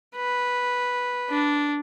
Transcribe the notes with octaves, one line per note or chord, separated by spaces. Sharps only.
B4
D4